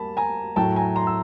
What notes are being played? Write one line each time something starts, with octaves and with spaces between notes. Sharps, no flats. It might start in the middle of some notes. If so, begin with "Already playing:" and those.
Already playing: G3 A#3 A5 B5
G#5 A#5
A2 F#3 A3 G5 A5
G#5 A#5
A#5 C6
E6